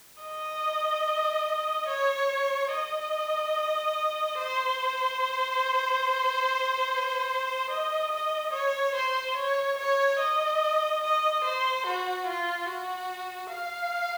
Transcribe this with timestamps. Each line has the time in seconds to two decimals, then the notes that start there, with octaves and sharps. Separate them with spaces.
0.22 D#5
1.88 C#5
2.71 D#5
4.38 C5
7.70 D#5
8.12 D#5
8.53 C#5
8.95 C5
9.36 C#5
9.78 C#5
10.19 D#5
11.03 D#5
11.44 C5
11.86 F#4
12.27 F4
12.68 F#4
13.51 F5